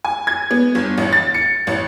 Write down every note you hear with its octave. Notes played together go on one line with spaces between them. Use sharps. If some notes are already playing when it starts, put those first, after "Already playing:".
G#5
G#6
B3
G1
A1
A6
C#7
A1